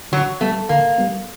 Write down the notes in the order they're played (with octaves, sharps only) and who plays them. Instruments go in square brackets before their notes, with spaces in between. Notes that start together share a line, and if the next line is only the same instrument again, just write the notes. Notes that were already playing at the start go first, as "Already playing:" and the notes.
[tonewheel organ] D3 [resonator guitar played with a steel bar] F#3
[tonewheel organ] G3 B3 [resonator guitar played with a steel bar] A3
[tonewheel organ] D3 [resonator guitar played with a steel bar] A#3
[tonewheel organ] G3 B3